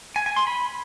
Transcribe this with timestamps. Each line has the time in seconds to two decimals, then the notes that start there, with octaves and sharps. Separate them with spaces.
0.16 G#5
0.26 G#5
0.36 C6
0.47 B5